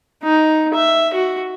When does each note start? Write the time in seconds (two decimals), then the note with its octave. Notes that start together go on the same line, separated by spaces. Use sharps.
0.23 D#4
0.75 E5
1.13 F#4